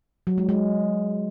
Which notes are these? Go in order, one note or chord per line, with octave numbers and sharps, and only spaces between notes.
F#3
G#3
G#3